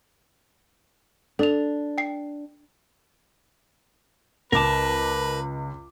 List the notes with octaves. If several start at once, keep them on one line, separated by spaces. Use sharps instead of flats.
D4 A4 F7
G5 C7
C#2 A#4 B4 A5 D6